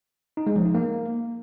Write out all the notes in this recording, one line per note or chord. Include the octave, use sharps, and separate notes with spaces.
D#4
G#3
F3
D#4
A#3